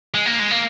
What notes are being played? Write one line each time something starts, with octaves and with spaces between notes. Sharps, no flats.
G#3
A#3
G#3
A#3